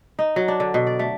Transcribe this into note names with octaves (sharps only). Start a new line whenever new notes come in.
D#4
F#3
D4
D3
B2
D5
A3